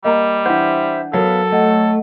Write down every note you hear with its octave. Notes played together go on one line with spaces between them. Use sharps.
G3 A#3 D#5 A#5
E3 D4 C5 E5 F#5
F#3 B3 A4 A#4 F5 F#5
A3 D#5 F#5